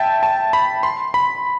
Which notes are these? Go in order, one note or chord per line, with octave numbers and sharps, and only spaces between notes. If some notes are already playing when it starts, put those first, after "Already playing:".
Already playing: E5 G5 A5
A5
B5
C6
B5